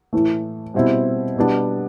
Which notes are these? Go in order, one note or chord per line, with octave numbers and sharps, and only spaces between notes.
A2 E3 A3
B2 G3 C4 E4
B2 G3 B3 D4